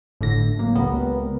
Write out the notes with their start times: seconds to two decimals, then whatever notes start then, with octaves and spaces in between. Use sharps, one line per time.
0.21 G1 A2 D3 A#6
0.59 F#3 A#3
0.75 C#2 B3 G4 A#4